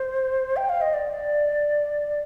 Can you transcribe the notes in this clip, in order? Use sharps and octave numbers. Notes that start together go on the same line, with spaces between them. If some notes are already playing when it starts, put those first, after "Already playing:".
Already playing: C5
G5
F5
D#5
D5